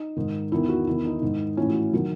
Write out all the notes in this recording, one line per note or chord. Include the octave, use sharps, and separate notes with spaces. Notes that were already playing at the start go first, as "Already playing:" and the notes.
Already playing: D#4
G#2 D#3
E2 D#3 E4
F#4
E2 D#3 E4
D#4
G#2 D#3
A2 E3 C#4
F#4
D#3 F#3